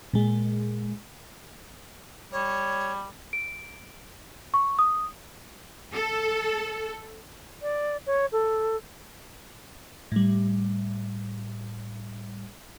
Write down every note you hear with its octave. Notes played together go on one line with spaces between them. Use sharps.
A#2 G#3
G3 C#5
D7
C#6
D#6
A4
D5
C#5
A4
A2 G3